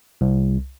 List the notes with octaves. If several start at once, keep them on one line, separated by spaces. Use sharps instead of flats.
C2